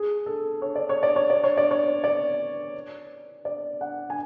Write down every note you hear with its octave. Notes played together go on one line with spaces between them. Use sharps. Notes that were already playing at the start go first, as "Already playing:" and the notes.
Already playing: G#4
A4
C#5
D5
C#5
D5
C#5
D5
C#5
D5
C#5
D5
D5
F#5
G#5